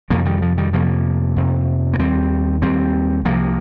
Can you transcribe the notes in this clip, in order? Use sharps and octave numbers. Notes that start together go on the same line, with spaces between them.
F2 C3 F3 A#3
D#3 G3
F3
D#3 G3
F2 C3 F3 A#3
F2 C3
A#3
D#2 G3 C4
D#2 G3 C4
C2 C3 F3 A#3